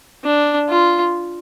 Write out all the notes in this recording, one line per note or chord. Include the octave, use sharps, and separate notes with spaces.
D4
F4